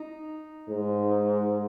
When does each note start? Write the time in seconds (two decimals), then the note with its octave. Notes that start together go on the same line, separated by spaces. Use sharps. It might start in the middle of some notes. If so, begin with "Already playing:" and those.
Already playing: D#4
0.69 G#2